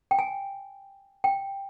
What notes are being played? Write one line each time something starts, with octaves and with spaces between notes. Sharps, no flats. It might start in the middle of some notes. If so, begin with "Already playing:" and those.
G5
G#5
G5